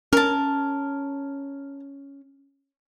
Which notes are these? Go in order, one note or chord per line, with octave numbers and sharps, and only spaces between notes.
C#4 A#4 A5